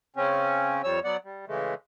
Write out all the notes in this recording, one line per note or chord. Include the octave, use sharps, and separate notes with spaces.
C#3 C4 C#4
F2 F3 G3 C#5 E6
F#3 B3 D5 F#5
G3
C#3 E3 G#3 A3